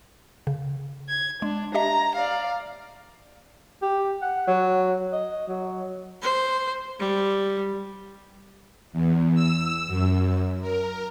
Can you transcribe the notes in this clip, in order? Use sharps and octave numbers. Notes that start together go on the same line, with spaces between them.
C#3
G#6
G#3 D4
G4 D#5 E5 A#5
D5 F5
G4
F#5
F#3
D#5
F#3
C5
G3
E2
E6
F#2
A#4